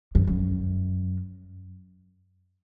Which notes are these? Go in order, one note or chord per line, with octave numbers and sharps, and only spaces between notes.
F#2
F#2